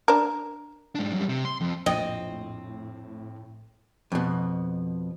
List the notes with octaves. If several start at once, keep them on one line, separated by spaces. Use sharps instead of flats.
D4 A#4
G#2 D4
F#2 G3
C3
C6
F2
A#1 F2 A2 C4 D#5
F2 B2